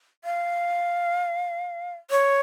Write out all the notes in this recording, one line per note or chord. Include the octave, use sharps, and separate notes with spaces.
F5
C#5